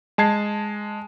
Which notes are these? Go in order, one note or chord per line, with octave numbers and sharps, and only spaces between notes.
G#3 A5 G#6 C7